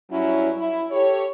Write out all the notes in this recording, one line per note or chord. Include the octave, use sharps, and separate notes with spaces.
G2 F#3 C#4 E4
E4
G4 A4 C#5